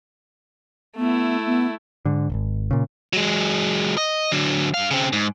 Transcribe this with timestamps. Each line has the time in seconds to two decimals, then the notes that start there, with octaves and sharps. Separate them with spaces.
0.97 A3 B3 E4
1.46 B3
2.05 G#2 D3
2.30 D#1 G#1
2.71 A#2 C#3
3.13 F#3 G#3
3.97 D#5
4.32 D3 F#3
4.74 G2 F5
4.91 C#3 C4
5.13 G#2